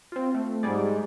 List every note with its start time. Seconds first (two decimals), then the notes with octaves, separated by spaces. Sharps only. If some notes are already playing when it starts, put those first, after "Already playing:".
0.12 C4 F4
0.34 A3
0.63 G#2 G3 G#4 D5